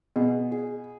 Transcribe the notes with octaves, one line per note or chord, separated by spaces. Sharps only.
B2 G#4
G#4